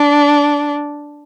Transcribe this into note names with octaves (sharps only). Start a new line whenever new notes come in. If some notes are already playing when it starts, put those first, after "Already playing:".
Already playing: D4